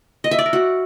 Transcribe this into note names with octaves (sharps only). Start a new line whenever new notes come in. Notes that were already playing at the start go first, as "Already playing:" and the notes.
D#5
E5
D5
A#4
F#4